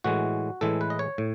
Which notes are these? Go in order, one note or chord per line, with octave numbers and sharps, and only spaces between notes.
A2 E3 G#3 F#4
A2 E3 G#3 A4
B4
D#5
C#5
A2